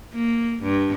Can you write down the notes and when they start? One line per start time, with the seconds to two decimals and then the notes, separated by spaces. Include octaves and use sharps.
0.13 A#3
0.63 G2